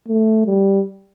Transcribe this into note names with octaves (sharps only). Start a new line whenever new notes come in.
A3
G3